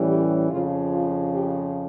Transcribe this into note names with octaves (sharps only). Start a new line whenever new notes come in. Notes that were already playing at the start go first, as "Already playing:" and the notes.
Already playing: A2 E3 G3 C#4
G4
F2 C#3 F3 F4
F4
G4